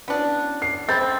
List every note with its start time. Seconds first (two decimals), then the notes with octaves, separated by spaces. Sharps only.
0.08 B3 C#4 D4 E4 F#4
0.62 D6 D#6 C7
0.89 C4 B5 G6 A6